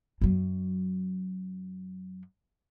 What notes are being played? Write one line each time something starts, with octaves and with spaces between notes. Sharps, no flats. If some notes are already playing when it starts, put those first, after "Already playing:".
F#2 F#3